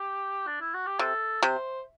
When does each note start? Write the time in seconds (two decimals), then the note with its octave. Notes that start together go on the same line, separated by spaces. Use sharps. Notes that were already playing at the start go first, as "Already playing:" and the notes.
Already playing: G4
0.47 D4
0.61 E4
0.74 F#4
0.86 G4
0.99 C3 A4
1.43 C3 C5